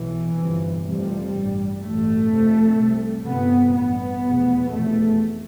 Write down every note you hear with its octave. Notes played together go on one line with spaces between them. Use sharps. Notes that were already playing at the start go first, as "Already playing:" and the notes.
Already playing: B1 B2 E3
G1 F2 C3
F1 F2 C3 G3
A1 G2
A1 G2 A3
F1 F2 C3
C2 C3
G1 F2 C3 B3
A1 G2 B3
F1 E2 B2
F1 E2 B2 A3